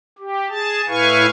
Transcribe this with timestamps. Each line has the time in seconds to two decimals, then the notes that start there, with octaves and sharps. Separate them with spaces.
0.19 G4
0.49 G#4 A5
0.88 A2 E4 B4 F5 G#5 C#6